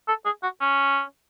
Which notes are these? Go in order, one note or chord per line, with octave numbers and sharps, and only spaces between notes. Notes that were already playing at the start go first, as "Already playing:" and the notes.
A4
G#4
F#4
C#4